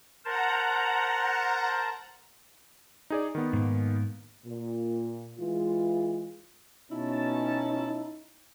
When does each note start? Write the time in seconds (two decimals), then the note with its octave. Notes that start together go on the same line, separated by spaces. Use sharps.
0.25 A#4 C5 F#5 A5 A#5
3.10 D#4 G#4 D5
3.35 D#3 B3
3.53 G#2 A#3
4.46 A#2
5.38 E3 G#3 F4
6.91 B2 C#4 D#4 E4 A5